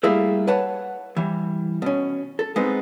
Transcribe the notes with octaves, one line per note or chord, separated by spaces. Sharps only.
G3 A3 A#3 E4 G#4 A4
B4 C#5 F#5 A5
E3 G3
B2 C#4
A4
G#3 B3 C4 D#4